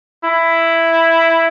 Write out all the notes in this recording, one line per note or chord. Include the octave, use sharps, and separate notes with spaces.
E4